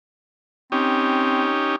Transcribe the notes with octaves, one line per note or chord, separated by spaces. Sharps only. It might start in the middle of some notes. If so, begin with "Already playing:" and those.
C4 C#4 D#4 G4